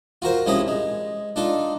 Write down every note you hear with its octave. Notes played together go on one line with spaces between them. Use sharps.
F4 F#4 A#4 C5
C2 F3 C#4 E4 G#4 A#5
G#3
D4 D#4 F4 A4